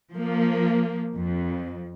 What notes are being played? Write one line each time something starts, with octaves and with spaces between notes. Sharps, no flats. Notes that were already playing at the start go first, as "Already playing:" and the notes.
F3 A#3
F2